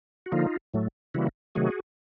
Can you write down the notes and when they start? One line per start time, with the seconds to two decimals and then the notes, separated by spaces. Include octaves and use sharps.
0.26 F#4
0.32 D3 F3 A#3 D#4 F4
0.74 A2 F#3 A3
1.14 C#3 E3 G3 A#3 E4 F#4
1.55 C3 D#3 F#3 A3 F#4 G#4